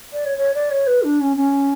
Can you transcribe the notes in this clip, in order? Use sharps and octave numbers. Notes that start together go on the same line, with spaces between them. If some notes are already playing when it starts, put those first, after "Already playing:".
D5
C#5
C#5
D5
C#5
B4
D4
C#4
C#4